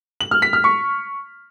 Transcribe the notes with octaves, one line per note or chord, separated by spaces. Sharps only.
F#7
F6
B6
F6
C#6